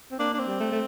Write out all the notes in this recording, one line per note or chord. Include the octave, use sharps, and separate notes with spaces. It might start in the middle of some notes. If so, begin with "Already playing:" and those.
C4
A#3 D4
D4
C4
G3
A3
A3